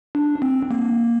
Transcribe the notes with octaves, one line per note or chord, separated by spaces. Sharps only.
D4
C4
A#3